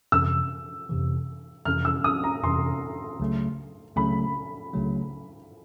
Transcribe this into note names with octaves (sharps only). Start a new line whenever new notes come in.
F2 C3 E3 E6
F2 C3 E3
F2 C3 E3 F6
E6
D#6
A#5
F2 C3 E3 C6
C#2 C#3 F#3 A3
C#2 C#3 F#3 A3 B5
C#2 C#3 F#3 A3